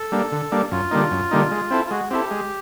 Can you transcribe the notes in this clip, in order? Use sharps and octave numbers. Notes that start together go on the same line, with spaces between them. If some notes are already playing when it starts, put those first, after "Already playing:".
Already playing: A4
G3 A#3 D4
D3
G3 A#3 D4
F#2 F4
D3 G3 A#3 D#4
F#2
D3 G3 A#3 D#4
G#3
C4 E4 A4
F4
G#3 F#4
C4 E4 G4 A4
G#3